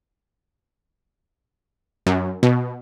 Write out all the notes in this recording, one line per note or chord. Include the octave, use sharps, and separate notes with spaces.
F#2
B2